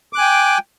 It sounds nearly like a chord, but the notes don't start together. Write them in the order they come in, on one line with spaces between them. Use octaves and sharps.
D6 F#6 G#5 G5